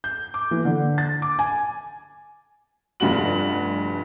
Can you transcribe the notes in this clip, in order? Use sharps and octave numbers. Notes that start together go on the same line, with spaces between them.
G6
D6
E3
D3
A6
D6
G#5
F1 G2 F4 F#4 F#7